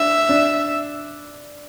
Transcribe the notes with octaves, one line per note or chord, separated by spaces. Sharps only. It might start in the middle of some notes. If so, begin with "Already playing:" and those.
Already playing: D4 E5
D4